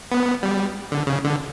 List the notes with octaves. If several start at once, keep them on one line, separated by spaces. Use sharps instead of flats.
B3
G3
D3
C#3
D3